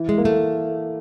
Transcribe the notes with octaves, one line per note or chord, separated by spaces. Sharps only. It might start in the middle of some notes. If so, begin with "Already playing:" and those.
Already playing: E3 E4
G#3
A#3
A3